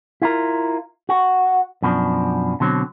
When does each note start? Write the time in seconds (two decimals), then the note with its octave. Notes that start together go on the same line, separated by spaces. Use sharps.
0.22 E4 F4 A#4
1.09 F#4
1.82 F#2 B2 F3 D4
2.60 B2 D3 F#3 C4